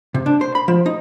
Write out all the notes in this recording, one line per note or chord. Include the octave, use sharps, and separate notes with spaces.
C3
D4
C5
B5
F3
D#4